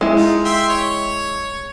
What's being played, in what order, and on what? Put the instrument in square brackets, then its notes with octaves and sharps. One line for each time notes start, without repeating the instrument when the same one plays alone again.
[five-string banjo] G#3 E4
[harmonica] D#4 F4
E5 G5 C6
C#5